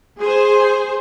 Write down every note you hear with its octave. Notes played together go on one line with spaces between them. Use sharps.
G#4 C5